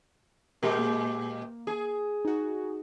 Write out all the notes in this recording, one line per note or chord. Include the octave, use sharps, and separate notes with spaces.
A#2 G#3 G4 A#4
A#3
G#4
D#4 F#4